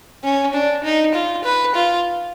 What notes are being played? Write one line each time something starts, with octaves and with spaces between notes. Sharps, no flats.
C#4
D4
D#4
F4
B4
F4